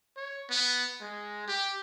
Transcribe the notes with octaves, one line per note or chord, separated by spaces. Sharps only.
C#5
B3
G#3
G4